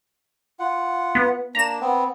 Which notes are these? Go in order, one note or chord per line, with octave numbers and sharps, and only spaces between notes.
F4 F#5
B3
A#3 D4 A#5 E7
B3 C4